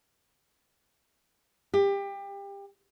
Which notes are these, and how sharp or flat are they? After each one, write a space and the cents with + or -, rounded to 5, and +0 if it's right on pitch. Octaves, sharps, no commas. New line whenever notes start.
G4 +25